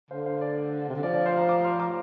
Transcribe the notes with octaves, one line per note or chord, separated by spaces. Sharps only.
D3 C5 F5
C5 F5
D5
C3
D3
F3 D5
D5
C5 F5
F5 A#5
A#5 D6
C6 F6
A#5 D6